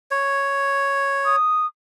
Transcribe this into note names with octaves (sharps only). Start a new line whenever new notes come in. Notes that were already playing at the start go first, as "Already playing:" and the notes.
C#5
D#6